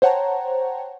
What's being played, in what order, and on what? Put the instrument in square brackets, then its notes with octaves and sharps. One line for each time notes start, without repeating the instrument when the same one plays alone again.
[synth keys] C5 C#5 F#5 G5 A5 A#5